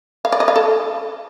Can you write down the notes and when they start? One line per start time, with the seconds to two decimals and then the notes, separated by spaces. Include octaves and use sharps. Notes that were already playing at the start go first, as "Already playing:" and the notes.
0.25 F5
0.32 D5
0.40 D#5
0.48 F5
0.56 A4